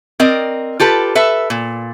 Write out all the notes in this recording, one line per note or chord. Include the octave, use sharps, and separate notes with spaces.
C4 A#4 D5 D#5
F4 G4 A4 B4
A4 B4 E5
A#2